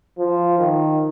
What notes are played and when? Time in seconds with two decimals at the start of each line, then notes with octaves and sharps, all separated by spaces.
0.18 F3
0.58 D#3